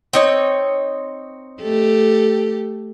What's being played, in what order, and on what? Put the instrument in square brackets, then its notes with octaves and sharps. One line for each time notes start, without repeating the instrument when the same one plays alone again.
[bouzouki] C4 D#4 C#5
[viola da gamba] A3 G4 A4